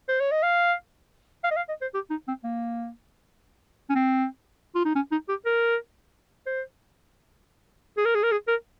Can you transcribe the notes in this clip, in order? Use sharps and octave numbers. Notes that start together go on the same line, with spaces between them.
C5
C#5
D#5
F5
F5
D#5
F5
D#5
C5
G4
D#4
C4
A#3
C#4
C4
F4
D#4
C#4
D#4
G4
A#4
C5
G#4
A#4
G#4
A#4
G#4
A#4